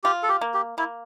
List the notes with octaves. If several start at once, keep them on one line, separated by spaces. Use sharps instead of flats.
F4 G4
A4
G4
A#3
G4
A#3 E4